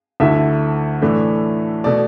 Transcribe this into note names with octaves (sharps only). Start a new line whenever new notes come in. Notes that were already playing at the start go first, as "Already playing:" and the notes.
D2 D3 A3 E4 E5
A2 E3 A3 D4
B2 A3 D5